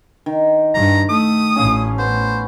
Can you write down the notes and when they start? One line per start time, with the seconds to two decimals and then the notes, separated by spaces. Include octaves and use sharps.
0.26 D#3
0.74 G2 A#5
1.09 A3 D#6
1.56 A1 A2 C#4 F5
1.98 B3 C5